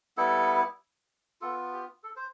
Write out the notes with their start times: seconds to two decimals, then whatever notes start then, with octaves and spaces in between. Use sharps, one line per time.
0.17 G3 B3 E4 A4
1.41 B3 F4 A4
1.73 G4
2.04 A4
2.16 C5